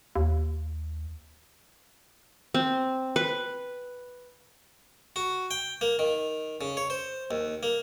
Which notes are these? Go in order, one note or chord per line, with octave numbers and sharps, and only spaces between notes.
D#2
C4
B4
F#4
G5
A#3
D#3
C#3
C#5
C5
D#2
A#3